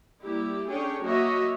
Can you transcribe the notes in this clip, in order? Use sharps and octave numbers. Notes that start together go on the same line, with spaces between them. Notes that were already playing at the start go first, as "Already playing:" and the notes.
G3 A#3 E4 G4
C#4 D4 G#4 A4 C#5 G5
F#3 A#3 F#4 C#5 D#5 E5